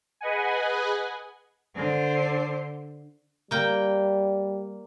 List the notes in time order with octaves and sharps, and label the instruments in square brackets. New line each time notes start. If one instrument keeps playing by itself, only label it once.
[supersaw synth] G#4 B4 D#5 F#5 G#5
[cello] D3 C5
[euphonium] G3 [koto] A#3 G5